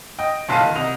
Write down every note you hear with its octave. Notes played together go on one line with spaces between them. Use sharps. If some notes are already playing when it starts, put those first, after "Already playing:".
D#5 G5
F#1 B1 F5 A5 D#7
D#3
C2 D#5 F7